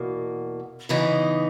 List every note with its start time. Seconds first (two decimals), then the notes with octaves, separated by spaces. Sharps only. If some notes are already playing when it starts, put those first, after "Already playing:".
Already playing: E2 B2 A#3
0.89 C#3 E3 B3 D#4